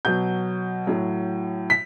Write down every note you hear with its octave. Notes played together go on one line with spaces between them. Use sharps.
B2 F#3 G6
A2 F#3
B6